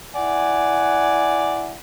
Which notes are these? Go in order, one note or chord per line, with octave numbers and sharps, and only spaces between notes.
E4 D5 F#5 G#5